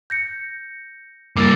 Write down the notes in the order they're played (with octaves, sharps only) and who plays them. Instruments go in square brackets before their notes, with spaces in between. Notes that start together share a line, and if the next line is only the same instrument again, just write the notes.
[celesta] G6 A#6 C#7
[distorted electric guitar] G2 A#3 [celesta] D6 E6 A6